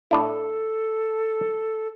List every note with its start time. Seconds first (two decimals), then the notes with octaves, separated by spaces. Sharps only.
0.11 A2 D4 E4 A4